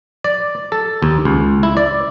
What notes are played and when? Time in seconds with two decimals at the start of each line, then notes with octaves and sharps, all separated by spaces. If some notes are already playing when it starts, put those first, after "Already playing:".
0.24 D5
0.72 A4
1.03 D#2
1.25 C#2
1.63 E4
1.77 D5